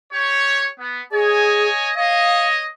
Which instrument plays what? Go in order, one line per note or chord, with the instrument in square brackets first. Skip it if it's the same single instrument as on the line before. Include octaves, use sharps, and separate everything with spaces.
[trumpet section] G4 C#5
B3
[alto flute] G#4 [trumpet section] C#5 D#5 G#5
[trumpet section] C#5 D#5 [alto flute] F5